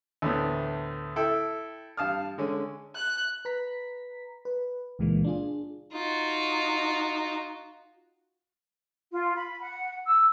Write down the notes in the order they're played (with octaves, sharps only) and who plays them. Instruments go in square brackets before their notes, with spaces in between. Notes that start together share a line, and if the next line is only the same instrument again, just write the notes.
[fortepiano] D2 A2 B3
E4 A4 G5
G2 F5 A5 D#6 F6
D3 G#3 C#4
[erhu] F#6
[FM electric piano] B4 A#5 B6
B4
C#2 A#2 E3 G#3 A#3
D4 F4 G#4
[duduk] D#4 [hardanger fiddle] F4 F#4
[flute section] F4
B5
F#5
E6